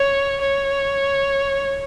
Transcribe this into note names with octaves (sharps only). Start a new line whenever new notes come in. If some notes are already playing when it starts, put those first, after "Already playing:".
Already playing: C#5
C#5